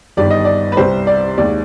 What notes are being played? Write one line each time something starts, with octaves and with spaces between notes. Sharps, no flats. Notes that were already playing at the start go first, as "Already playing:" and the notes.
G1 G2 D#3 G3 D5
D#5
D5
B4
C2 C3 G3 C5
D5
D#2 D#3 G#3 D5